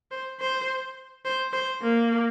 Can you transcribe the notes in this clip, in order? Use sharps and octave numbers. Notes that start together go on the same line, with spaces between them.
C5
C5
C5
C5
A#3